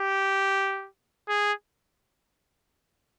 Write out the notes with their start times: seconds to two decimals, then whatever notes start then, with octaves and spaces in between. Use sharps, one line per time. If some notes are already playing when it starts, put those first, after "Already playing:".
Already playing: G4
1.29 G#4